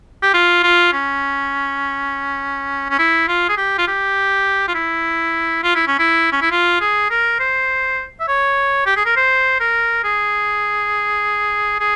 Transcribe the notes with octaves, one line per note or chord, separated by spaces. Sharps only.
G4
F4
F4
C#4
C#4
E4
F4
G#4
G4
F4
G4
F4
E4
F4
E4
C#4
E4
C#4
E4
F4
G#4
A#4
C5
E5
C#5
G4
G#4
A#4
C5
A#4
G#4
G#4